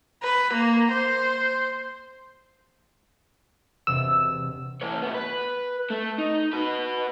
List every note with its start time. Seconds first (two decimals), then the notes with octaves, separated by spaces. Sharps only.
0.23 B4
0.53 A#3
0.92 C5
3.87 E1 C3 E6
4.81 E3 C#5
5.02 A2 B3
5.15 B4
5.90 A3
6.18 D#4
6.53 F#4 B4